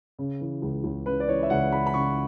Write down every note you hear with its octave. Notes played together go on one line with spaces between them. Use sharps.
C#3
E3
C#2
C#2
C#3 B4
D5
E3 C#5
E5
C#2 F#5
C#2 B5
B5
C#3 C#6